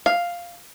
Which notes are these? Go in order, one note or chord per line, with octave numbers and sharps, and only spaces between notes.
F5